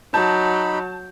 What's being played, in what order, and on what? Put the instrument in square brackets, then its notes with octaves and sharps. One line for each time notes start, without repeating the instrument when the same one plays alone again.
[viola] F#3 [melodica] D#4 B5 [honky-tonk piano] A5 [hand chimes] G6